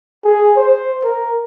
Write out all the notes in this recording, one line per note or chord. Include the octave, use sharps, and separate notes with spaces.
G#4
C5
A#4